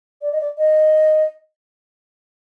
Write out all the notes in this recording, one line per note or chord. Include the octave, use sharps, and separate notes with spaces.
D5
D#5
D5
D#5